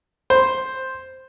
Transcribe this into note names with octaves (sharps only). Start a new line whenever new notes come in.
C5